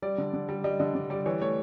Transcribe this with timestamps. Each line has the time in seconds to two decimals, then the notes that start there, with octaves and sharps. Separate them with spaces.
0.02 G3 D5
0.18 D3
0.33 D3
0.49 G3
0.64 G3 D#5
0.79 D3 D#5
0.95 D3 D5
1.10 G3 D5
1.26 E3 C#5
1.41 A3 C#5